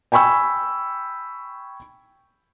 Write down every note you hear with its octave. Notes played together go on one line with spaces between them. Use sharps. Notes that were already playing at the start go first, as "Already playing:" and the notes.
G5 G#5 B5 C#6 E6